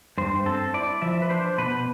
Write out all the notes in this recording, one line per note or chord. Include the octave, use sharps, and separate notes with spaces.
G2 C5
C4 A4
E4 D5
F3 E5
B4
D4 C5
B2 B4